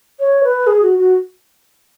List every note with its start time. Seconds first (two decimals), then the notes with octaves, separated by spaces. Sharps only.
0.20 C#5
0.44 B4
0.67 G#4
0.82 F#4
0.99 F#4